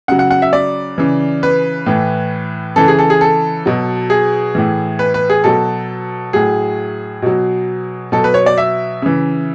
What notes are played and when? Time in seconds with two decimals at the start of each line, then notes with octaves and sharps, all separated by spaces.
0.08 C#3 F#3 F#5
0.19 F#5
0.30 F#5
0.42 E5
0.53 D5
0.98 C#3 E3
1.43 B4
1.86 A2 E3
2.76 C#3 E3 A4
2.88 G#4
2.99 A4
3.10 G#4
3.21 A4
3.66 B2 F#3
4.10 G#4
4.55 A2 E3
4.99 B4
5.14 B4
5.30 G#4
5.44 B2 F#3 A4
6.33 A2 F#3 G#4
7.22 B2 F#3
8.12 B2 F#3 A4
8.24 B4
8.34 C#5
8.46 D5
8.58 E5
9.02 C#3 E3